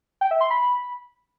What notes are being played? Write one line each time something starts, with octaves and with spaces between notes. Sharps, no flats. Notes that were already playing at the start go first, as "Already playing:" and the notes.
G5
E5
C6
B5